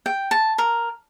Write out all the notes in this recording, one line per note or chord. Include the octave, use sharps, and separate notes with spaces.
G5
A5
A#4